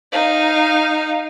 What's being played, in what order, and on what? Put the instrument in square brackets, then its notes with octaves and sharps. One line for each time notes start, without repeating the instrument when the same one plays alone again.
[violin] D#4 F5